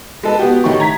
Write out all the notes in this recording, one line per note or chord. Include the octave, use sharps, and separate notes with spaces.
G#3 A4 B4
B3 F#4 G4
A1 D#3 A3 G4 C#6
A#5 G#6 B6